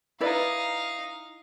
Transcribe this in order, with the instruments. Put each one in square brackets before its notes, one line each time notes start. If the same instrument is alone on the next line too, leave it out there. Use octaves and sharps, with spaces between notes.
[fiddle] D#4 F5 [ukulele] E4 B4 D5